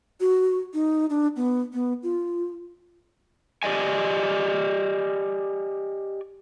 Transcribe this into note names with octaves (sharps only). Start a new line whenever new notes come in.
F#4
D#4
D4
B3
B3
F4
G4 D5 D#5 G#5